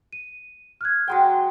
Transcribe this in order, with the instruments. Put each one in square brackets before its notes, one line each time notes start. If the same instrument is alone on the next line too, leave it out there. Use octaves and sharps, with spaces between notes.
[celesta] D#7
F6 F#6 G#6
[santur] F#3 G#3 G5 [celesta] F#5 A#5 C6